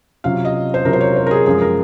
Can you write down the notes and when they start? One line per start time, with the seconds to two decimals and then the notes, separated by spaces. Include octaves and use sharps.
0.24 C3 F#3 C#4 F4 F5
0.45 D#5
0.74 C5
0.85 C3 F#3 C#4 F4 A#4
0.93 C5
1.01 C#5
1.16 C5
1.26 A#4
1.31 G#4
1.46 F#2 F3 G#3 G#4
1.62 A#4